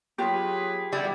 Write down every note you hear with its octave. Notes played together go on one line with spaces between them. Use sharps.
F#3 F4 G4 G#4 B4
G3 B3 E4